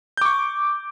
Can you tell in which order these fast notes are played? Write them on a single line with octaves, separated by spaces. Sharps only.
G6 D6 C#6